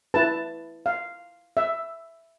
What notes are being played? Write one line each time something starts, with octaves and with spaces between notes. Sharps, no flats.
E4 B4 A5
F5
E5